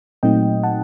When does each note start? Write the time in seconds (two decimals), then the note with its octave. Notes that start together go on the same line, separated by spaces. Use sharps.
0.23 A#2 F#3 A3 C4 D#4 D#5 G5
0.63 F#5 A5